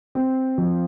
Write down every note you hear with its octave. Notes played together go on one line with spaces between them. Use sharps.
C4
F3